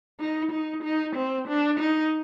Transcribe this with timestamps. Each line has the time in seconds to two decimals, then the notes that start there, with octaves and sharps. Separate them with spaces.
0.20 D#4
0.52 D#4
0.83 D#4
1.15 C4
1.48 D4
1.80 D#4